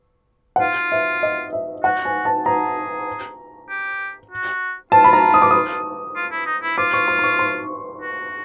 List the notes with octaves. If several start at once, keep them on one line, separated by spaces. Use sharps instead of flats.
F#5
F4 F5
E5
D#5
E5
F#4 F#5
G#5
A5
G#4 A#5
G4
F#4
F4 A5
B5
A#5
D#6
D6
D#6
F4
E4
D#4
E4
F4 D6
C#6
C6
C6
C#6
C6
F#4